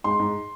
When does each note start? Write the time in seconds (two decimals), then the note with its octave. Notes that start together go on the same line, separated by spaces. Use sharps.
0.04 G#2 C6
0.20 G#2